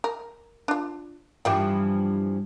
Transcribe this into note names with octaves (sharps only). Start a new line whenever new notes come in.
A#4
D4 F4
G2 E3 F3 G4 E5 G5